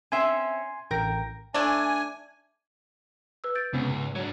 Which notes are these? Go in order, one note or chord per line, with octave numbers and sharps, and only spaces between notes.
C4 C#4 E5 G#5 C6
A1 A#4 G5 A#6
A3 D4 G#5
B4 E6
G6 A6 D7
C#2 C3 B3 C#4
G#2
F#3 D4 C#5